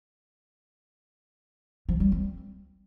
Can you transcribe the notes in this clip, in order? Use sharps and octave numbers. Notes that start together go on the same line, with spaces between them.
F3
G3
C4